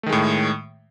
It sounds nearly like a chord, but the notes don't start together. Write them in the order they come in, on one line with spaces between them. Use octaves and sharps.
A3 D#3 G#3 A2